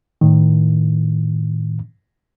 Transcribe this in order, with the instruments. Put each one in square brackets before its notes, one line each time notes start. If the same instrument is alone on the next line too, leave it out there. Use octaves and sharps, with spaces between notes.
[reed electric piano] A2 D#3